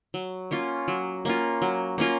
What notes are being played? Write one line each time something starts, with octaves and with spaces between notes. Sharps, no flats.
F#3
A#3 C#4 F4
F#3
A#3 C#4 F4
F#3
A#3 C#4 F4